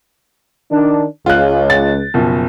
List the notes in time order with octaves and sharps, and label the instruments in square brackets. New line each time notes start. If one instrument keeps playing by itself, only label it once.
[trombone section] D#3 D4
[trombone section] C#2 [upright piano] F4 F#6
[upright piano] A6
F#1 B2 F3